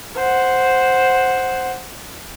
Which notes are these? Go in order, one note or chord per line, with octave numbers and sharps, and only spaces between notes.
C5 F#5